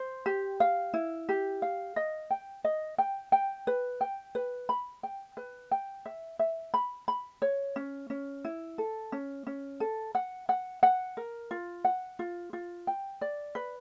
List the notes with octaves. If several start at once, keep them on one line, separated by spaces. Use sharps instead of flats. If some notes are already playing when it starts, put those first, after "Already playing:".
Already playing: C5
G4
F5
E4
G4
F5
D#5
G5
D#5
G5
G5
B4
G5
B4
B5
G5
B4
G5
E5
E5
B5
B5
C#5
C#4
C#4
E4
A4
C#4
C#4
A4
F#5
F#5
F#5
A#4
F4
F#5
F4
F4
G5
D5
B4